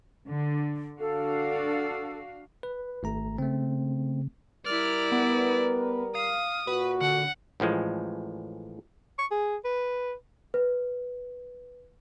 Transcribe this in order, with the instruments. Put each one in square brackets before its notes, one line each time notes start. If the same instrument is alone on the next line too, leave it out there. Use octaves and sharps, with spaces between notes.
[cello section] D3
[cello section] D4 F#4 F5 [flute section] A4
[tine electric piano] B4
G#1 A3 A#5
[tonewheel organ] C#3 [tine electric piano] A3 C4
[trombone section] G3 A#4 [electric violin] E4 D5 [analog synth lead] F6
[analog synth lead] B3
[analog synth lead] F5 [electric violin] D#6
[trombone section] A#2 F#4 [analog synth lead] B4
[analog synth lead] D3 [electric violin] F#5
[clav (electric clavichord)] A1 A2 F3 G#3
[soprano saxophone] C#6
G#4
B4
[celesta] B4